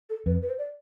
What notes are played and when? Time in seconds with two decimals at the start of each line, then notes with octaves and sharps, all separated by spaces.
0.10 A4
0.26 F2 B4
0.42 B4
0.50 C5
0.58 D5